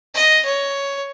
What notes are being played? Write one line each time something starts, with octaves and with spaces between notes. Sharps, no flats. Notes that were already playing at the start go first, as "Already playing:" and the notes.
D#5
C#5